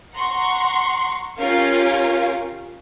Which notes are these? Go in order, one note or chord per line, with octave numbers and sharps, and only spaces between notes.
F#5 A#5 C6 C#6
C#4 F4 G4 A#4 F5